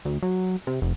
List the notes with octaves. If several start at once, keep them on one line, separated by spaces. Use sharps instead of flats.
D2
F#3
C3
F1